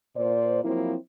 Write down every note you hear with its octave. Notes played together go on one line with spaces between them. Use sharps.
A#2 C5 D5
F3 F#3 A#3 C4 E4